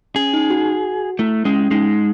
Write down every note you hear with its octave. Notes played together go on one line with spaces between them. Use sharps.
C#4 G#4
D#4
F#4
A3 E4
G#3 C#4
G#3 D#4